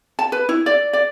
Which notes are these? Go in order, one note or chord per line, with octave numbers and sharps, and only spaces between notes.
A5
B4
E4
D5
D5